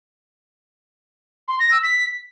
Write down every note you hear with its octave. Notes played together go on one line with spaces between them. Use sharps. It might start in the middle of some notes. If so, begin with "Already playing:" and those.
C6
A#6
E6
B6